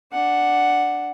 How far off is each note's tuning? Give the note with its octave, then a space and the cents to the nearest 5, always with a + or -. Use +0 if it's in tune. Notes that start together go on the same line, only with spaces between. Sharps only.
D4 +0 F#5 +0